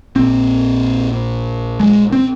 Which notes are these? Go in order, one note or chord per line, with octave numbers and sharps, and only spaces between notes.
A#1 A#2 C4
G#3
C4